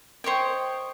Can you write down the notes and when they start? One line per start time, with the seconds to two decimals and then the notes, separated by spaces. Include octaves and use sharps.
0.24 C5 C#5 D#5 G5